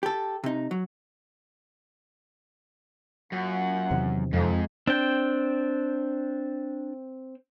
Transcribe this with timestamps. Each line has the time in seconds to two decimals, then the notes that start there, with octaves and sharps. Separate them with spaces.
0.03 G4 A4
0.44 C3 D#4
0.71 F#3
3.32 F#2 A#3 F4 F#5
3.91 E2 C3 D#3
4.33 F2 G#2
4.87 C4 D4 G5